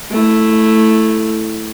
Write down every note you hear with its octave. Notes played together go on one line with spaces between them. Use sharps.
A3 E4